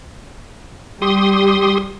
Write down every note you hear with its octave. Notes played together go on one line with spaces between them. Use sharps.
G3 G4 C6 D#6